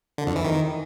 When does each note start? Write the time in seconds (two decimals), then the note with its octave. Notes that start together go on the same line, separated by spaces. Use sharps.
0.18 D3
0.27 F2
0.36 E3
0.44 D#3